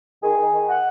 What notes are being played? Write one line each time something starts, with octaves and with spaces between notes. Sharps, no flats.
D#3 G#4
D#3
D#3
F#5